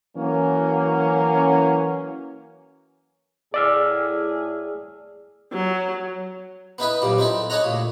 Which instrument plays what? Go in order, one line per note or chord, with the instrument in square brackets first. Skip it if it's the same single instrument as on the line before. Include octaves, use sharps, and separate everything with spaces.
[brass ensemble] E3 F#3 A#3 C#4
[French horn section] A2 G#4 [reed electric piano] D5 E6 F6
[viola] F#3
[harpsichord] B3 D#4 E4 B4
F#2 A#2 G3
C4 D#4 E4 A4
D#4 A4 C#5 D#5 F#5 A#5
D2 A#2